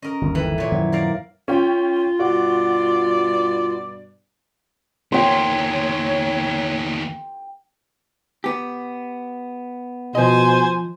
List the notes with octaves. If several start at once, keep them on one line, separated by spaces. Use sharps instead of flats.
C#4 A#4 D#5
G1 D#2
E3 A4 E5 G5
A#2 C#5
F#2 D#3 F3 F#3 E4 E5
A#4 D5 F5
C#4 F4 G5
G2 B2 F#4 D5
E2 A#3 C#5 G5 C6
B3 G4
B2 F3 C5 D#5 G#5